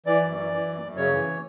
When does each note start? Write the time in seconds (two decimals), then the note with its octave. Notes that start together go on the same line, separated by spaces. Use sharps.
0.06 E3 D5
0.21 F#2
0.36 E3
0.52 E3
0.67 F#2
0.82 F#2
0.97 C#3 C#5
1.12 E3